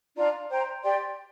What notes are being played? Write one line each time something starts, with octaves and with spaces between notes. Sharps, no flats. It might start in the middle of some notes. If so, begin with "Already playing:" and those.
D4 F4 D5 A#5
C5 G5 A#5
G4 D5 G5 C6